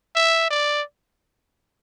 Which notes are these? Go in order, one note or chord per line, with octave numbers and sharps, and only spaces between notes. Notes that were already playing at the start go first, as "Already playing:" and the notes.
E5
D5